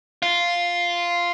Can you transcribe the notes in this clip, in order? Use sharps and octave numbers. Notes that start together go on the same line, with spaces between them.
F4